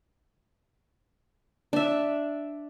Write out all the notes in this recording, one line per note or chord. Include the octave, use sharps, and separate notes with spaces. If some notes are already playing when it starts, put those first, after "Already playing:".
D4 E5